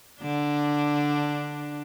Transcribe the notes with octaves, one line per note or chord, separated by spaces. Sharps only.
D3 D4